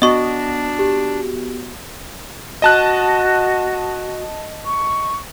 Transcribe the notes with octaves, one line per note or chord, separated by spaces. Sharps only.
B3 D4 F#4 D#5 C#6
G4
F#4 D#5 A5 F#6
C#6